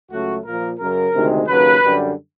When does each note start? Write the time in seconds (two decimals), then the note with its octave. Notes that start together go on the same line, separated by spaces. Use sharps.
0.11 C#2 C#3 F#3 A3 F#4
0.45 A#2 F3 A#3 A#4
0.79 F#2 C#3 F#3 A#4
1.15 D2 C3 D#3 G#3
1.48 D#2 C#3 F#3 B4
1.83 F#2 D3 G3